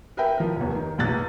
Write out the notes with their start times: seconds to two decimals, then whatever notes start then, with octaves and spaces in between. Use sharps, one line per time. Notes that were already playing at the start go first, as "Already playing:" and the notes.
0.17 A#4 B4 E5 G5
0.37 F3 A#4
0.56 F1 D#2
0.75 D#3
0.98 F1 A#1 F#6 A6